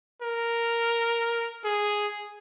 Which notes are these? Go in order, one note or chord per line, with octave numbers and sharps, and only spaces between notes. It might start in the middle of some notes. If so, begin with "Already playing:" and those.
A#4
G#4